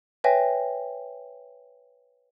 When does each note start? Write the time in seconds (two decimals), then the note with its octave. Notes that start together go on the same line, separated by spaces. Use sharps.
0.24 B4 C#5 E5 G5 G#5 A#6